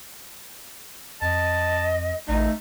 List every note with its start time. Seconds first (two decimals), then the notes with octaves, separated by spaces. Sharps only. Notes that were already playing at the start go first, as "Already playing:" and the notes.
1.21 F2 D#5 A5
2.28 A1 A3 D#4